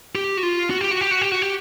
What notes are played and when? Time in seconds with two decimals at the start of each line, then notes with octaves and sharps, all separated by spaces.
0.15 G4
0.37 F#4
0.43 F4
0.70 F#4
0.81 G4
0.91 F#4
1.01 G4
1.11 F#4
1.22 G4
1.32 F#4
1.42 G4